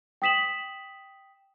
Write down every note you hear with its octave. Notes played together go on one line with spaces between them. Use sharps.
G5 D#6 B6 E7 F#7